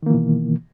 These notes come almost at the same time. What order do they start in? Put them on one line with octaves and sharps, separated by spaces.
D#3 A#3 E3 B2